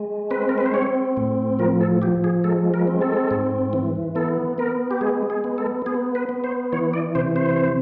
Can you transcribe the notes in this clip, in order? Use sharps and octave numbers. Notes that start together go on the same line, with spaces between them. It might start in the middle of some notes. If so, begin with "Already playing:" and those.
Already playing: G#3
C4 B4
A#4
B4
C5
C4 C#5
A2
F3 A#4
A4
F3 G4
G#4
G#3 A4
A#4
C4
A4
G#2
E3
B3 A4
B3 A#4
G4
G#3 G#4
G#4
B3
A4
B3 G#4
B4
B3
C5
E3 C#5
D5
C3 C5
C5